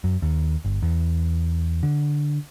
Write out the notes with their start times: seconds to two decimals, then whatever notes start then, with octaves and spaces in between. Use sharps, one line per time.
0.04 F#2
0.22 D#2
0.64 G1
0.82 E2
1.83 D3